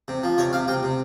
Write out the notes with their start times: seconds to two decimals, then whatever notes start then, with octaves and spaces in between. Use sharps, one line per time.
0.08 C3
0.23 F3
0.38 C3 C#5
0.53 C3 F5
0.68 C3 G5
0.83 C3